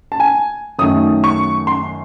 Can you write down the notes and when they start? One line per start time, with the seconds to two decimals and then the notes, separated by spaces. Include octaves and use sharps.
0.12 A5
0.20 G#5
0.79 F#2 D#3 A3 D#6
1.24 C#6
1.67 C6